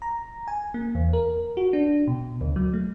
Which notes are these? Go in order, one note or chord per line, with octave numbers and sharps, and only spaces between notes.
A#5
G#5
A#3
E2
A#4
F#4
D4
B2
D2
F#3
A3